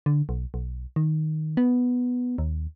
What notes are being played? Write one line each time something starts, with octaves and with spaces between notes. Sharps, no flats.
D3
B1
B1
D#3
B3
D#2